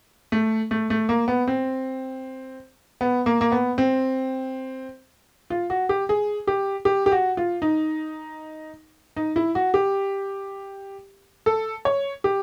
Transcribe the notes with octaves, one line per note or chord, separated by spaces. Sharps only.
A3
A3
A3
A#3
B3
C4
B3
A#3
A#3
B3
C4
F4
F#4
G4
G#4
G4
G4
G4
F#4
F4
D#4
D#4
E4
F#4
G4
A4
C#5
G4